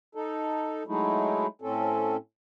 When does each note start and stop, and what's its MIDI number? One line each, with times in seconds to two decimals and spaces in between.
0.15 0.83 63
0.15 0.83 69
0.87 1.47 54
0.87 1.47 56
0.87 1.47 57
0.87 1.47 63
0.87 1.47 64
1.62 2.17 45
1.62 2.17 60
1.62 2.17 61
1.62 2.17 69